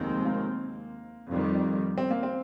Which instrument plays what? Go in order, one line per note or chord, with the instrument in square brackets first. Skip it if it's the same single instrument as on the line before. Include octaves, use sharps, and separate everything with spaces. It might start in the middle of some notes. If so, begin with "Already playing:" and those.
Already playing: [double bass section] F1 D#2 D#3 G#3 C4
[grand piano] A#3
[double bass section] F2 D#3 G3
[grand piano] C4
A#3
C4